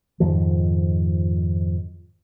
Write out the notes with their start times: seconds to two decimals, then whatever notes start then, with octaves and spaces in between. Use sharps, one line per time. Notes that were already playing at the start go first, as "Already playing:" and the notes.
0.20 F2 G#2 D#3 F3